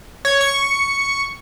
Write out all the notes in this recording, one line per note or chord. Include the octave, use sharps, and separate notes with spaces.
C#5
C#6